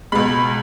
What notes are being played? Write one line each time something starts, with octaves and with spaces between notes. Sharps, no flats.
C#2 B2 G#3 B5